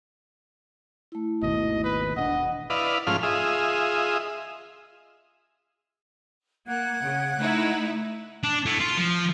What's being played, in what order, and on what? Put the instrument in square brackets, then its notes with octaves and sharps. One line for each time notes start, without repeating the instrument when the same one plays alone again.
[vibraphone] A3 E4
[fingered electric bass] G#1 D#2 B2 [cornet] D#5
[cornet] B4
[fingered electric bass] E1 C4 D4 [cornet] D#5 [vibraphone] F#5
[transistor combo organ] E4 B4 D5 D#5 F5
G#2 F3 A3 C#4 F4 F6
F4 G#4 D#5 E5
[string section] A#3 [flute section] F#5 F#6 G#6
[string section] C#3
A3 D#4 E4
[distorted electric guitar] D4
A3 E4
F4
F3